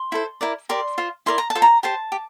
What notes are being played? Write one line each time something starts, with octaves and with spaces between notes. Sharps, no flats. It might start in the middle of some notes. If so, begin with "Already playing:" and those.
Already playing: C6
E4 A4 C5
E4 A#4 D5
G4 A#4 D5 C6
F4 C5
E4 A#4 D5 C6
A#5
A5
F4 A4 C5
A#5
G4 C5 A5
G4